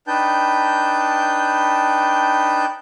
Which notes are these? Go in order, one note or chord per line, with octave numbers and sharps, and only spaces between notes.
D4 D#4 B4 G5 A5 G6